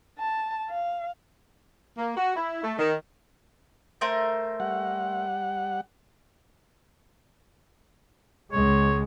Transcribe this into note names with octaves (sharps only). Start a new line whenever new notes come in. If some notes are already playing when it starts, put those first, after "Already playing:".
A5
F5
A#3
F#4
E4
A3
D#3
A3 A#4 C5
G3 F#5
C#2 G#3 C#5